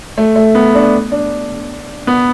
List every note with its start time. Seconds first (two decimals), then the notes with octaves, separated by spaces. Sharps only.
0.18 A3
0.36 A3
0.55 B3
0.75 D4
1.12 D4
2.07 B3